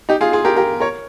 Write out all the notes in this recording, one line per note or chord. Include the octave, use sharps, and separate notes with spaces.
D#4 G4
F4 G#4
F4 G#4
G4 A#4
G4 A#4
A#4 C#5